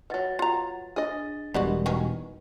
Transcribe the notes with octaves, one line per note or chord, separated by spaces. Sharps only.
D#3 F#3 B4 F#5 A6
F4 A#5
D4 G#4 D#5 A6
E1 B2 G3 G#3 B3 F#4 A#4 D5
D#3 F#3 C#4 B4